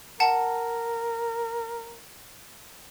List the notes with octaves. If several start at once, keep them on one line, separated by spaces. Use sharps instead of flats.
A#4 F#5 A5